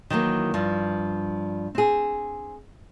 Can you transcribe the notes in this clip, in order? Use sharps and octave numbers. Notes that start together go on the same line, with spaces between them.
D#3 E3 F#3 A#3
G2 F3
C4 G#4